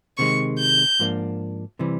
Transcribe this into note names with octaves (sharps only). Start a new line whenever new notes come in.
C3 D#3 G#3 C#6
G6
G#2 F3 A#3 D4
C3 E3 G3